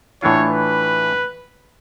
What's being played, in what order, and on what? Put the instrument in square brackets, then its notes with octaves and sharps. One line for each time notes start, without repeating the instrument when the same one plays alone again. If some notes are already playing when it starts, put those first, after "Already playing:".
[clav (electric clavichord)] A2 E3 A3 D4 F4 [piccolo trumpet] C#5
[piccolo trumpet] B4